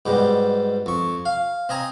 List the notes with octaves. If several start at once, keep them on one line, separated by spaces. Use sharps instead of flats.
G#2 B2 G3
F2 C#6
F5
C4 D#5 G#5 A#5